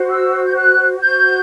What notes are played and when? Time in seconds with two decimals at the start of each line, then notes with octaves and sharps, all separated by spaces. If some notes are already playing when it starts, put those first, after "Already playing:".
Already playing: F#4 C5
0.10 E6
0.46 G6
0.55 F#6
0.99 F#4 C5 G6